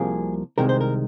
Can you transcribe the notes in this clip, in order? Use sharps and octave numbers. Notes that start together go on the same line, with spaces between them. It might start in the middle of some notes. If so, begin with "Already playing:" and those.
Already playing: C2 C3 F3 A#3 G#4
C2 C3 D#3 G#3 A#4
C5
A#4